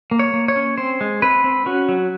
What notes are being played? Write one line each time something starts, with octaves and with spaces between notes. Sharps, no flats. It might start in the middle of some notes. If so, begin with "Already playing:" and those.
A#3
C#5
A#3
C#5
C#4
C4 C5
G#3
C4 B4
C4
C#4 F#4
F#3